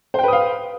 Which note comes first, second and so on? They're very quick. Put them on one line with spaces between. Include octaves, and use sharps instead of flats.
C5 G5 B4 D#6 F5